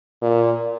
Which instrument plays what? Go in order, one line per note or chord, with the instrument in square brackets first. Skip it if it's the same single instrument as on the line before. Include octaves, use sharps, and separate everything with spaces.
[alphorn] A#2